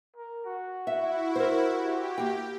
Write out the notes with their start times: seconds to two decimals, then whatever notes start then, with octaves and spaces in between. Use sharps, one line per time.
0.16 A#4
0.46 F#4
0.87 E4 E5
1.36 A#4 C5
1.75 G4
2.18 A#3 G5